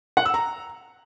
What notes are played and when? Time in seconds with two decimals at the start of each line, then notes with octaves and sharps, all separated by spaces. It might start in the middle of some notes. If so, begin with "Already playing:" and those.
0.17 F#5
0.25 E6
0.34 A#5